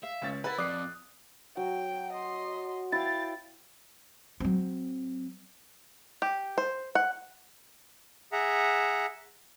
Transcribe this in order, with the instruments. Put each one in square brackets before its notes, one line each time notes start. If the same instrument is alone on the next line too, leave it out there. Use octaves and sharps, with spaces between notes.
[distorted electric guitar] E5 [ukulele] F5
[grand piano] C#2 C#4 A6
[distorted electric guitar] E4 [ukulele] A#4 F#5 [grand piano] B4 A6
[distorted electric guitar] F2 [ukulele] D5 [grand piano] D6 C7 [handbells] D#6 F#6
[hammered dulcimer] F#3 [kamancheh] G5
[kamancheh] D#5 C6
[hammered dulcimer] E4 F5 [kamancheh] G5 [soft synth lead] A6
[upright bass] F#3 C4
[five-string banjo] G4
C5
F#5
[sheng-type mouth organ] G#4 E5 F#5 A#5